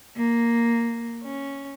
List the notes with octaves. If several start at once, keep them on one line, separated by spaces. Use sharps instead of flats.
A#3
C#4